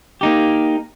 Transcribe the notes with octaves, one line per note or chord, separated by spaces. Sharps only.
A#3 D#4 G4